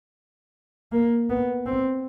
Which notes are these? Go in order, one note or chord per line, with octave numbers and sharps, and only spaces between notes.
A#3
B3
C4